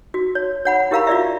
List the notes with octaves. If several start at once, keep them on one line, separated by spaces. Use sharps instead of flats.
F#4
C#5
C#5 F#5 B5
E4 G4 A#4 F5 A#5 B5
F4 F#4 D5 E5